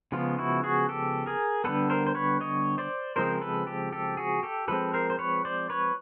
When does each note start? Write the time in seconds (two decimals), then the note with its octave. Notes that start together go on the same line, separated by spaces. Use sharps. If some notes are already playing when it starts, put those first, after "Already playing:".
0.12 C#3 F3 G#3 B3 F4
0.38 E4 F#4
0.64 F#4 G#4
0.89 G4 A4
1.26 G#4 A#4
1.64 D3 G3 B3 A4 B4
1.90 A#4 C5
2.07 C5
2.15 B4 C#5
2.41 C#5 D#5
2.78 C5 D5
3.16 C#3 F3 G#3 C4 A#4 C5
3.41 A4 B4
3.67 G4 A4
3.93 G4 A4
4.17 F#4 G#4
4.43 G4 A4
4.68 F3 G#3 C4 A4 B4
4.94 A#4 C5
5.10 C5
5.19 B4 C#5
5.45 C5 D5
5.70 B4 C#5